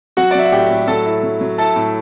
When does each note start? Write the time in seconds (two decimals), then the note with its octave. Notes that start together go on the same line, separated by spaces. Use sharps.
0.17 F#3 F#4 F#5
0.31 D5
0.35 F#3 E5
0.46 F#5
0.52 A2 G4 G5
0.70 A2
0.88 F#3 A4 A5
1.06 E4
1.23 F#3
1.41 F#3
1.58 E4 A4 A5
1.76 A2